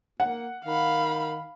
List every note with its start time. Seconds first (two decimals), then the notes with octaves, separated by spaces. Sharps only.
0.20 A#3 F#5
0.65 D#3 F5 B5